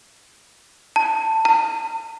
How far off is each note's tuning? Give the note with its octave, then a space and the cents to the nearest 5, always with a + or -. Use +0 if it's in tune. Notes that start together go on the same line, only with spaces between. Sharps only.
A5 +15
A5 +45